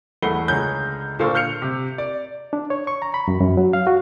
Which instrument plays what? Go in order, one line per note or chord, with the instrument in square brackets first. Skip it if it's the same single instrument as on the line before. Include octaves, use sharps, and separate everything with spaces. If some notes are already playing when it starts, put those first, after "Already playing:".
[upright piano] E2 A3 F#5 B5 C7 G7
C#2 D3 G#4 C#5 A#5 G6
A#2 D3 A4 C5 F5 C#6
F6 G6 C7 C#7 F7
C3
D5
[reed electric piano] D4
C#5
C#6
A#5
B5
F#2
F#2
F#3
F5
F#4